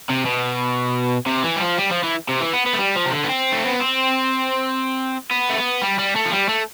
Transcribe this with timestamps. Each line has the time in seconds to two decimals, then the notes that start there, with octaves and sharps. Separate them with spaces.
0.09 C3
0.25 B2
1.27 C3
1.44 E3
1.56 G3
1.61 F3
1.77 G3
1.91 F3
2.03 E3
2.29 C3
2.40 E3
2.53 B3
2.66 B3
2.73 A3
2.79 G3
2.96 F3
3.06 C3
3.13 D3
3.25 B3
3.29 C4
3.52 A3
3.66 B3
3.80 C4
5.31 B3
5.49 A3
5.57 B3
5.82 G3
5.99 G3
6.16 A3
6.26 F3
6.33 G3
6.49 A3